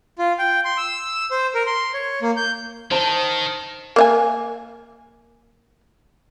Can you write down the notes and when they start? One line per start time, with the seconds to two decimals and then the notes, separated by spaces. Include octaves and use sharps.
0.19 F4
0.39 G5
0.65 C6
0.78 E6
1.31 C5
1.55 A#4
1.67 C6
1.94 C#5
2.22 A#3
2.37 G6
2.91 D#3 C5 A5
3.96 A#3 E5 G#5